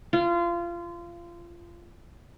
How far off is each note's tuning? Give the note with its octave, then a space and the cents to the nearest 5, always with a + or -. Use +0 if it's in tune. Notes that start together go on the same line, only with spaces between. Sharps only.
F4 -25